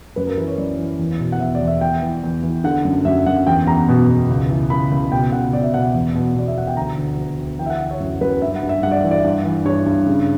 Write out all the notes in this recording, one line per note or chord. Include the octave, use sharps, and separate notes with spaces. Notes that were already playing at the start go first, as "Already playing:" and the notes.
F#2 B4
A#4
E3 B4
C#5
F#2 D5
E3
E2
B2
F#5
E2 E5
D5
E2
E5
E2 G5
E3
E2
E3
D3 F#5
F#2
F#2 E5
F#2 F#5
E2 G5
E2 A#5
B2
B2
C#2
E3
C#2 B5
C#2
B2 G5
C#2 F#5
B2 D5
E5
B2 F#5
E2
B2
B2 D5
E5
E2 F#5
G5
D2 A#5
D2
D2
D2
E3 G5
E5
F#5
E3 E5
C#5
F#2
F#2 B4
G2 E5
F#5
G2
E5
G2 F#5
D5
E5
E3
D5
G2
E3
G2 C#5
G2
C#3